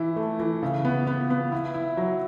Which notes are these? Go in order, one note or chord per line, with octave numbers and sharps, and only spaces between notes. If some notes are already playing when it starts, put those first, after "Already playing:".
Already playing: E3 E4
A3
E3
C#3
B3
B3
B3
E4
E4
F#3